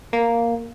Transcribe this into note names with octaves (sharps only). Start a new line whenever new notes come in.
A#3